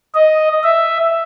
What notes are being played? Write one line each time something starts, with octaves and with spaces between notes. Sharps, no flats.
D#5
E5